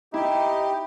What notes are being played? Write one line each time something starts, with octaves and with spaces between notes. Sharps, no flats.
D#4 E4 G4